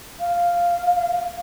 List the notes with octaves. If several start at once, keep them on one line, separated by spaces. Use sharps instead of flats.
F5